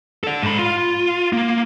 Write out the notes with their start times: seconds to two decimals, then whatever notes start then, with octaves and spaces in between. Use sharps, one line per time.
0.24 A4 D5
0.42 G#2 B5
0.59 F4
1.33 A#3